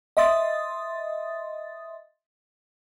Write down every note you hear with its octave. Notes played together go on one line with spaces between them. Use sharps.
D#5 E5 C6 D#6 A6